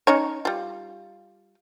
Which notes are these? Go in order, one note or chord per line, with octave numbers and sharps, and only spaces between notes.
C#4 D#4 C#5
G3 F4